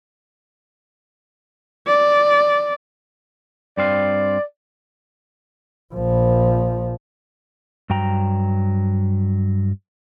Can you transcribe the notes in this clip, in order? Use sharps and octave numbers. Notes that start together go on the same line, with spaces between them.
D5
G2 C4 D5 F5
A#1 F3
G2 F#3 G5 A#5